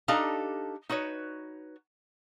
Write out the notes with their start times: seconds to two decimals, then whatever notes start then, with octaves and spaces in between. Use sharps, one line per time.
0.08 D4 D#4 G4 A4 F5 A#5
0.89 D#4 F#4 B4 C#5